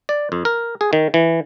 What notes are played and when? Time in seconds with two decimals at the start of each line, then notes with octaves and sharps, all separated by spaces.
0.09 D5
0.32 F2
0.45 A#4
0.81 G#4
0.93 D#3
1.14 E3